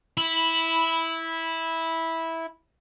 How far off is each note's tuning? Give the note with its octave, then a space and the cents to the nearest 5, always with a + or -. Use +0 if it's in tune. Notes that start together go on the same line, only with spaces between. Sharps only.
E4 -10 B5 +0